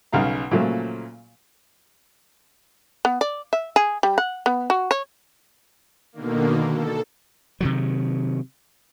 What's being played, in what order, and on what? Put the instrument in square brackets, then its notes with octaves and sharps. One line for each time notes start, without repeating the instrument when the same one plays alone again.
[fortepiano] B1 C#3 F5 A#5
A#2 C#3 F3 F#3 A3
[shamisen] B3
D5
E5
G#4
G3
F#5
B3
F#4
C#5
[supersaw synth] B2 D3 D#3 A#3
A4
[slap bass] C3 D#3 F#3